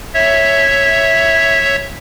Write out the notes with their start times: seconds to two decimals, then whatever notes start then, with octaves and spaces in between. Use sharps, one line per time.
0.14 C#5 E5